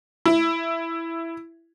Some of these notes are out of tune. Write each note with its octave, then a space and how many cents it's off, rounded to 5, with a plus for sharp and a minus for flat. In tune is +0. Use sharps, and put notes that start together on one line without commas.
E4 +5